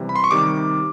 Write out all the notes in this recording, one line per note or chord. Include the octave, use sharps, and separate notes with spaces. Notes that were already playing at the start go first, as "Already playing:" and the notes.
Already playing: C3 E3 G3
B5
C6
C#6
C3 D#3 G3 D6